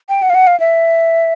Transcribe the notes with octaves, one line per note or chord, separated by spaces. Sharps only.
G5
F#5
F5
F#5
F5
E5